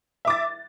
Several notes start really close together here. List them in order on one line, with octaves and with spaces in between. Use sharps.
E5 D6 A6